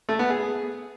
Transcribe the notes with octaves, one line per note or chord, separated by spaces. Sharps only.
A3
B3
G#4